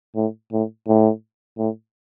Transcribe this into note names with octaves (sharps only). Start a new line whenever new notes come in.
A2
A2
A2
A2